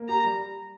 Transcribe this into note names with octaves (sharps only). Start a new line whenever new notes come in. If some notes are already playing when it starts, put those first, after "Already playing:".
Already playing: A#3
G4 A#5
G3